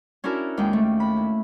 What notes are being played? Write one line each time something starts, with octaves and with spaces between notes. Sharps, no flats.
C#4 D4 E4 F#4 A#4 A5
D#2 G#3 G5
A3
B5
E4